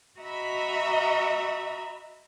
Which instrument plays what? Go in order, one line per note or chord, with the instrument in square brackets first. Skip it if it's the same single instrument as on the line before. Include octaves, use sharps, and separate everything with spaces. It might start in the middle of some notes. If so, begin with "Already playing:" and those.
[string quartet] F#4 D#5 E5 A#5 B5